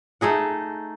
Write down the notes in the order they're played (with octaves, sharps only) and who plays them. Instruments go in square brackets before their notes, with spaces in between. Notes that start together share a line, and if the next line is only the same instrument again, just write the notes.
[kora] A3 D#4 G#4 F#5